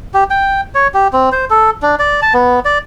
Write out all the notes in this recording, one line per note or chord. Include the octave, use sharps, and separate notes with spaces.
G4
G5
C#5
G4
C4
C5
A4
D4
D5
A5
B3
D5